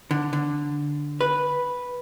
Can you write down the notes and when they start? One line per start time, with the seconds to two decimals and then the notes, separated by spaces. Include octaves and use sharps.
0.11 D3
0.33 D3
1.21 B4